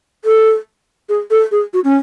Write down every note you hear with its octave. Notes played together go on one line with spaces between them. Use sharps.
A4
G#4
A4
G#4
F#4
C#4